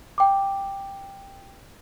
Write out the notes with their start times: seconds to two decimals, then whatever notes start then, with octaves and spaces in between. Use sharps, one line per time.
0.18 G5 D6